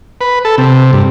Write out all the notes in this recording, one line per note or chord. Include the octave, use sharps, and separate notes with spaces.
B4
A4
C3
G2